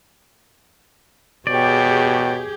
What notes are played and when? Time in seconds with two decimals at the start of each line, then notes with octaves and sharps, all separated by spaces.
1.47 B2 G4 G#4 C#5 D5 G5